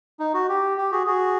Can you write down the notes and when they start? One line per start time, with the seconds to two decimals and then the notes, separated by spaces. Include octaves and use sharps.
0.19 D#4
0.34 F#4
0.49 G4
0.78 G4
0.91 F#4 G#4
1.06 F#4 G#4